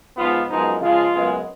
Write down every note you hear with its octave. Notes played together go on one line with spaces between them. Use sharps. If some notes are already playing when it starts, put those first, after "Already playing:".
G#2 F3 B3 F4
F#2 F3 G#3 B3 D#4
C#3 F3 G#3 F4
F#2 C#3 G#3 B3